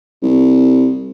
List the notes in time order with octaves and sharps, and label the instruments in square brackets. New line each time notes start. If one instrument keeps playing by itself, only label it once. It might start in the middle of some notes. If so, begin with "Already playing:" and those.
[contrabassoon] C2